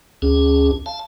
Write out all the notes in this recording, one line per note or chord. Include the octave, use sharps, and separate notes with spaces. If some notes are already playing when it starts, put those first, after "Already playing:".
D2 C#4 G#4
F5 A5